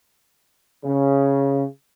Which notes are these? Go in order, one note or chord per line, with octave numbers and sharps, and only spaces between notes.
C#3